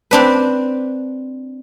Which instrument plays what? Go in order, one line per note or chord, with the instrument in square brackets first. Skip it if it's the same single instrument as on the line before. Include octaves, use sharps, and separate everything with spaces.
[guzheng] C4 D4 B4